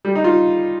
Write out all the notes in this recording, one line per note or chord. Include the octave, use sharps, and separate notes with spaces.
G3
D#4
F4